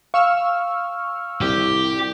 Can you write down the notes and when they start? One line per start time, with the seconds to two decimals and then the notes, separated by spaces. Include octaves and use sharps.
0.14 F5 C#6 E6 F6
1.41 C2 G4